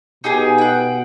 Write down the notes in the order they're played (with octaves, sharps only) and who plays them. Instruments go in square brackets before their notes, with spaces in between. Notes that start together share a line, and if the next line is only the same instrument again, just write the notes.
[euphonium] B2 [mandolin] D#4 G4 G#4
[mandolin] F#5 G5